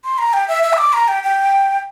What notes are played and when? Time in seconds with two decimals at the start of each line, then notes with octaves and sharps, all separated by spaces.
0.04 C6
0.18 A#5
0.33 G5
0.48 E5
0.63 E5
0.73 E6
0.78 D6
0.93 A#5
1.08 G5
1.23 G5